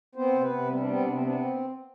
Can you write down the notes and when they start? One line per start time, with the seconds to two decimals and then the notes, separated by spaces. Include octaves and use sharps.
0.15 B3 C4 C5
0.33 C3
0.41 B3 B4
0.50 C3
0.67 G3 C4
0.78 D4
0.84 B3
0.89 C4
1.01 C3 D4
1.12 C4
1.18 B3
1.23 D4
1.35 C4